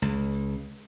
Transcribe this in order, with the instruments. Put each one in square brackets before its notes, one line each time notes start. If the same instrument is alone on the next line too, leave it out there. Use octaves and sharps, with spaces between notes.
[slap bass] C#2